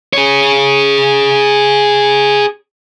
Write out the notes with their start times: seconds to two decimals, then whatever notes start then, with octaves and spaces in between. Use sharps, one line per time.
0.13 G#4 C#5